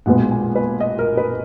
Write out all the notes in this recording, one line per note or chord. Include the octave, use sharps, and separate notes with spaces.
B1 A#2 G#3 B3 F#5
G#5
B4
D#5
A#4
B4